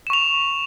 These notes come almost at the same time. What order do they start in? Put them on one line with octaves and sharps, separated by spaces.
E7 C#6 F7